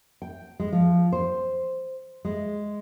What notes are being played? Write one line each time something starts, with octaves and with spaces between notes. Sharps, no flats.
G5
G#3
F3
C5
G#3